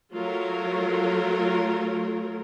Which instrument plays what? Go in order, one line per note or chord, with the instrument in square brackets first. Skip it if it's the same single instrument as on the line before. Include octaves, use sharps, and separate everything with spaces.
[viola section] F#3 A3 F4 A#4 C#5